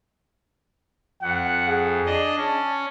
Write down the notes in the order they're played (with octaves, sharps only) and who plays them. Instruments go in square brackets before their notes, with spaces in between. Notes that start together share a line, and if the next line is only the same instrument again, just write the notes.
[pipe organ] F2 [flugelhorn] F#5
[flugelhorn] G#4
[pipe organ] D4 D#5
[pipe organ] C#4 [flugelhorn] A5